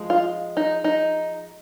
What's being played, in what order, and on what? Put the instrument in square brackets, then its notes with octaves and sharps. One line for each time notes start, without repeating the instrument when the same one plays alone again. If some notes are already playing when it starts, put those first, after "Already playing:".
Already playing: [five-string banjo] F3 G#3
F4
D#4
D#4